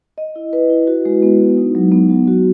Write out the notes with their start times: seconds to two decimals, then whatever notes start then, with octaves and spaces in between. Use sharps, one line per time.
0.18 D#5
0.36 E4
0.53 B4
0.70 E4
0.87 F#4
1.05 G#3
1.22 B3
1.40 G#3
1.58 D#4
1.75 F#3
1.92 B3
2.10 F#3
2.27 F#4